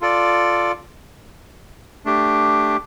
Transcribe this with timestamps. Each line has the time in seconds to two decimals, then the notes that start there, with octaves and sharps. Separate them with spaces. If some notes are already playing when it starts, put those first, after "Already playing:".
0.01 F4 A4 D5
2.05 A3 D4 G4